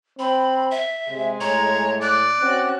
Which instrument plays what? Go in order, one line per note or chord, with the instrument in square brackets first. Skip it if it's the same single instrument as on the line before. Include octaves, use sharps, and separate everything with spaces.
[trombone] C4 [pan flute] B5
[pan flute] E5
[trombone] C3 [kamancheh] G#3 G#5
[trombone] A2 [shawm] C#5 [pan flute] A#5
[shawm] D5 [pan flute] F#6
[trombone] C4 [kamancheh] C#4 F#4